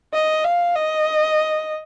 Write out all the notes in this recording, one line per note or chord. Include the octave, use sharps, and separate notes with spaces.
D#5
F5
D#5